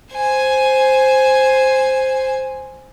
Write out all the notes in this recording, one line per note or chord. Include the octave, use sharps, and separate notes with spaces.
C5 G#5